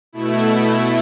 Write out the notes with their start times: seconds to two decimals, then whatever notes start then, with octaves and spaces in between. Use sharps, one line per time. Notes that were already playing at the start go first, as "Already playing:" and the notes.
0.13 B2 A3 E4